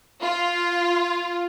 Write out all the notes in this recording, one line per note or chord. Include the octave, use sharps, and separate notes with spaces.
F4